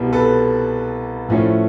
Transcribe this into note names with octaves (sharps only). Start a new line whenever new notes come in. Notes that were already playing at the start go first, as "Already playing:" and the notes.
Already playing: C2 B2 G3 B3
A4 B4
A2 F3 A3 C#4